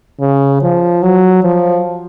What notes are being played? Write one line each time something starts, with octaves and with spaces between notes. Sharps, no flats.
C#3
F3
F#3
F3